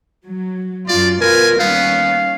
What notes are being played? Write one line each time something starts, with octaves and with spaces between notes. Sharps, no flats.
F#3
F#2 F4 D5
B2 F4 A#4 B4 G#5
D#2 G3 B3 C#4 F5